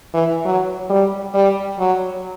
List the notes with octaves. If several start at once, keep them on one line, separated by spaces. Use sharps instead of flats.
E3
F#3
G3
G3
F#3